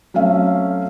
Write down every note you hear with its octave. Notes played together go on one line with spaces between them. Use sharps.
F#3 A3 C4 C#4 E5 F5